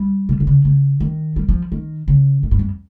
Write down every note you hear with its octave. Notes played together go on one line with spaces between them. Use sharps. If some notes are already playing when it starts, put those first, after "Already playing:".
Already playing: G3
C3
C3
C#3
C#3
D#3
G3
F3
D#3
C#3
G#2
G2
F2